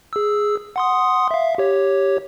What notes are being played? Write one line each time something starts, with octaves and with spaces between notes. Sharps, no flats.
G#4 E6
F#5 C6 D#6
E5 F5
G4 C#5